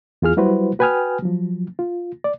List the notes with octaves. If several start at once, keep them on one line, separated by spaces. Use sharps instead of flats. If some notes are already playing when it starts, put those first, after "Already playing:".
E2 F4 G#4 F6
F#3 G3 E4 F#4 B4 C5
F#4 B4 G5 G#5 D#6 F6
F3 F#3
F4
D5